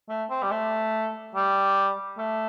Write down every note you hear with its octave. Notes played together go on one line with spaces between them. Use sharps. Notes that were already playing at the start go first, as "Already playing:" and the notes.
A3
C4
G3
A3
G3
A3